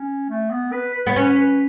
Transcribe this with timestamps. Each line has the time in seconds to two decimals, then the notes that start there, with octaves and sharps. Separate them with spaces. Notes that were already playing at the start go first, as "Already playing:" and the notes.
Already playing: C#4
0.29 A3
0.51 B3
0.72 B4
0.94 B4
1.07 B3 C#5
1.16 C#4 B4
1.38 B4